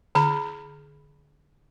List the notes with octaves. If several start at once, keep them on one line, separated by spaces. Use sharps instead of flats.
D3 B5